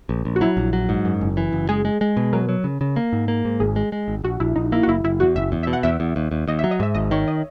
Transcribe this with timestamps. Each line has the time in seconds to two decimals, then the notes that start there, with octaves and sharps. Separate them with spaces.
0.09 A#1
0.25 A#1
0.36 F#4
0.41 F#3 E4
0.57 A#1
0.73 F#3
0.89 G#2
1.05 F#2
1.21 F#1
1.37 E3
1.52 F#1
1.69 G#3 G#4
1.85 G#3
2.01 G#3
2.17 B2
2.33 F#3 A#4
2.49 F#3
2.64 C#3
2.81 C#3
2.96 A#3
3.13 G#2
3.28 A#3
3.45 G#2
3.60 G#1 G#4
3.76 G#3
3.92 G#3
4.08 G#1
4.24 A#1 F#4
4.40 A#1 E4
4.56 A#1 D#4
4.72 A#3 E4
4.83 F#4
4.88 F#1 E4
5.04 F#1 E4
5.20 E2 F#4
5.36 F#1 E5
5.52 E2
5.63 E5
5.67 B2
5.73 F#5
5.83 E2 E5
6.00 E2
6.16 D#2
6.31 D#2
6.48 D#2 D#5
6.59 F#3 E5
6.71 D#5
6.80 G#2 E5
6.94 G#1 D#5
7.11 D#3 C#5
7.28 D#5